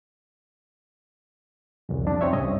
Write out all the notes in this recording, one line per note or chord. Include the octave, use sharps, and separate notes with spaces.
C2 F2
F2 D4
C4 D#4 C#5 E5
C2 G2 C#4 D#5